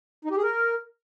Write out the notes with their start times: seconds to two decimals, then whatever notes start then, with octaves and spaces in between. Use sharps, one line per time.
0.25 D#4
0.31 G4
0.37 G#4
0.43 A#4